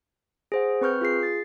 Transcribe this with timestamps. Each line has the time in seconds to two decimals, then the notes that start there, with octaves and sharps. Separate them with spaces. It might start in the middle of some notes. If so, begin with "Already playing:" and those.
0.52 G#4 C5 F#5
0.81 C4 B4 C#6 F6 G6
1.01 F4 G#4 C7
1.23 A6